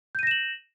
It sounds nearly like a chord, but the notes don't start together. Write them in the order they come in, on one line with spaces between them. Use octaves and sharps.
G6 D#7 A#6 E7 F#7